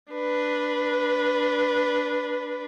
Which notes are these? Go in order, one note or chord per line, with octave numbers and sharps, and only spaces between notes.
D4 B4